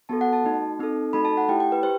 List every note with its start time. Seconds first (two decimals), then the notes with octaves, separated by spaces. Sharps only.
0.09 B3 F#4 A4 A5
0.21 F#5
0.33 A5
0.45 A3 D#4 F#4
0.79 C4 D#4 A4
1.13 A3 D#4 F#4 A4 B5
1.25 A5
1.37 F#5
1.48 A3 E4 G4 G5
1.60 G5
1.72 B4
1.83 G4 C5